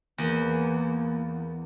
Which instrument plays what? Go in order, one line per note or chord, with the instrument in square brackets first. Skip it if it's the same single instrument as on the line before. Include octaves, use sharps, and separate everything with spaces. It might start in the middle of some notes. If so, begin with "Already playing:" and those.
[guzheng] E2 [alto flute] A#3